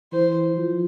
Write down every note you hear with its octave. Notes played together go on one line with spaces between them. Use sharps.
E3 C5
F3